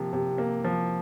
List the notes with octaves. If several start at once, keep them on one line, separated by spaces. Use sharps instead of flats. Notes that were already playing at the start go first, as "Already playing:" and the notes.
Already playing: C3 F3 A#3
C3
A#3
F3